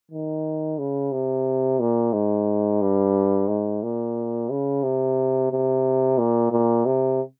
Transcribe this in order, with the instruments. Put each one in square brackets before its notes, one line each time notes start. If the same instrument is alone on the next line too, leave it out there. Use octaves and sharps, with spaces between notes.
[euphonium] D#3
C#3
C3
A#2
G#2
G2
G#2
A#2
C#3
C3
C3
A#2
A#2
C3